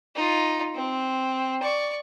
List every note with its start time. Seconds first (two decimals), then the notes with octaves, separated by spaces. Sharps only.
0.16 D#4 F4
0.75 C4
1.62 D5 C#6